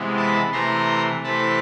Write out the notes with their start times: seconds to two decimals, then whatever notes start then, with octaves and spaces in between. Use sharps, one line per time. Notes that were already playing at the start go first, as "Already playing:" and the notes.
Already playing: C3 E3 G#3 B3
0.17 A5 B5
0.52 C3 E3 A3 A#5 C6
1.23 C3 E3 A3 C4 A5 B5